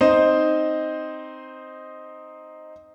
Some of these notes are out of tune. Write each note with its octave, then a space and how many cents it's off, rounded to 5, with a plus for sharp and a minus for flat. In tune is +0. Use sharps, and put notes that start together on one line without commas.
C4 +0 D#4 +0 C5 +0